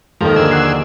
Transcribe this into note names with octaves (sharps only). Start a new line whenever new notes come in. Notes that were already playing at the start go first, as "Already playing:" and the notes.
D#2 D#3 F3 A#3 A4 F7
D3 G#4 E6
F#5 F#6 C7